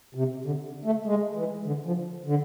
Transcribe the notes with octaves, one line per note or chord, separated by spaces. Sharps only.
C3
D3
A3
G#3
E3
D3
F3
D3